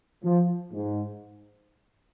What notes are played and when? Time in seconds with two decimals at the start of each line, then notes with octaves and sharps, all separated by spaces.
0.24 F3
0.72 G#2